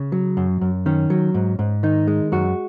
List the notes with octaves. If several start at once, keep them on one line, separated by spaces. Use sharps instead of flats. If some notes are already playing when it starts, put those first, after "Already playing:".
Already playing: C#3
F#3
F#2
F#2
D#3 C#4
F#3
G#2
G#2
D#3 D#4
G#3
F#2 F#4